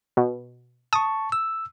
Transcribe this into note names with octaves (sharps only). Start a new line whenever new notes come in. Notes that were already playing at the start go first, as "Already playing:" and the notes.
B2
A5 C#6 D#6
E6